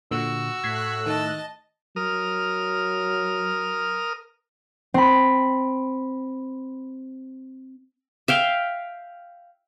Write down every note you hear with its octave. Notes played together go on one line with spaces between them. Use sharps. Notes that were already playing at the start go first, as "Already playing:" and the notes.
A#2 D3 F#4 E6
A2 A3 F#6 G#6 B6 C7
D#3 D#5 A5
F#3 A#4 D#6 F6
C4 B5
E5 F5 G5